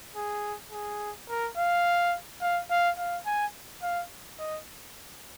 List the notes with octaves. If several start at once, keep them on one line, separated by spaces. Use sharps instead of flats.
G#4
G#4
A#4
F5
F5
F5
F5
G#5
F5
D#5